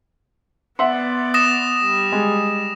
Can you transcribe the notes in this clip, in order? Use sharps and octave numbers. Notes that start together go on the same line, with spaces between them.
B3 D5 E5 F#5 C6
D#6 A#6 E7
G3
G#3